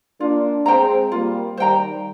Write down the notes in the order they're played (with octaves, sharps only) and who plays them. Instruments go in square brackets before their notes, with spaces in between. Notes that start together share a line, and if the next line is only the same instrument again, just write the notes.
[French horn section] A#3 D4 [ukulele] F4
[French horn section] G#3 C4 [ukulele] C5 G5 A#5
[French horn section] G3 A#3 [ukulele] F4
[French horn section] D#3 G3 [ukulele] C5 G5 A#5